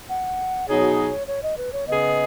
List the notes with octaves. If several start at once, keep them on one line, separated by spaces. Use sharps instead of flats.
F#5
B2 F#3 D#4 G#4 C#5
C#5
D#5
B4
C#5
C#3 B3 G#4 D#5